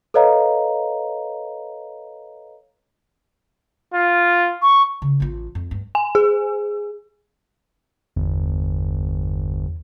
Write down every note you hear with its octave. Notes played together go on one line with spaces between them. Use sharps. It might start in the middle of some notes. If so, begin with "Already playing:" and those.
A4 B4 C#5 D#5 F5 A#5
F4
C#6
C#3
A1 F4
F2
G2
G#5
G#4
G1 E2